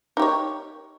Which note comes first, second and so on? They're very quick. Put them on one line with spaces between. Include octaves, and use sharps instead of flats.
D#4 G4 C#5